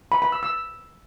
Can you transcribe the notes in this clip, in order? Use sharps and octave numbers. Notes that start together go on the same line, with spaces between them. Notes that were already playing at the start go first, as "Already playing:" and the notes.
B5
B5
E6
E6